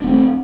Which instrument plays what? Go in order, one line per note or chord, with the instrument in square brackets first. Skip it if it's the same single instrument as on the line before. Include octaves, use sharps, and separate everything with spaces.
[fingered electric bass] D4
B3
C4
A3